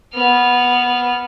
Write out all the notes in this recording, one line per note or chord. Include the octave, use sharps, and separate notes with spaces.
B3 F6